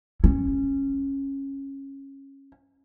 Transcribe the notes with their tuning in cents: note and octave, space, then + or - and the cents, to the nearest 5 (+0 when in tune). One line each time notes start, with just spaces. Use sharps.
C#4 -15